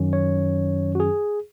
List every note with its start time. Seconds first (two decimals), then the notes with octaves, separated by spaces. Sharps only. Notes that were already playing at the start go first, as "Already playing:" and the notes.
Already playing: F#2 D#3 F#3 C#4
0.13 C#5
0.95 F#4
1.00 G#4